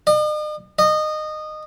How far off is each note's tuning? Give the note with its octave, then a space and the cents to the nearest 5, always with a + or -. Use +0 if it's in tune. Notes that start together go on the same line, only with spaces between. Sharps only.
D#5 -45
D#5 -20